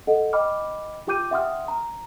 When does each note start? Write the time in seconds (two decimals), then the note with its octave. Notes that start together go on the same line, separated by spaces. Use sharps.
0.07 A4 D#5 F#5
0.33 D#5 G5 B5 D6 F6
1.07 F4 G4 G5 D6 G6 D#7
1.31 E5 F#5 G5 C6 D#6 F6
1.68 A#5